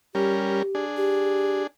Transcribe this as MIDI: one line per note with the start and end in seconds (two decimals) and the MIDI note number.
0.15 0.62 55
0.15 0.62 61
0.15 0.84 67
0.15 0.62 70
0.75 1.67 62
0.75 1.67 68
0.97 1.63 67